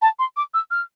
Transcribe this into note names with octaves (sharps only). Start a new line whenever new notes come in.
A5
C6
D6
E6
F6